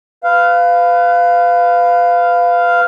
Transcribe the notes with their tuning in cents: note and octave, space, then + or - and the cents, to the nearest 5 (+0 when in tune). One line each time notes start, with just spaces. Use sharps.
B4 +20 F5 +0